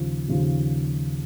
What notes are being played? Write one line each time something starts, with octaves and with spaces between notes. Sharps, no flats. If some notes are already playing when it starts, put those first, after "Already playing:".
Already playing: D#2 C#3 F3
D#2 C#3 F3